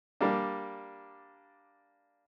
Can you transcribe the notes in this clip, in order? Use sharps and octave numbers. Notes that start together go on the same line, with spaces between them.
G3 A#3 D4